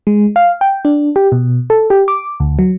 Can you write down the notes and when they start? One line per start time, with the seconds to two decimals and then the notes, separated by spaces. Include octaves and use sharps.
0.07 G#3
0.36 F5
0.61 G5
0.85 D4
1.16 G4
1.32 B2
1.70 A4
1.90 G4
2.08 D6
2.40 D2
2.59 F#3